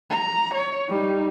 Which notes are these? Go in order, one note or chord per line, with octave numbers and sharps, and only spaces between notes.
A#5
C#5
G3 D#4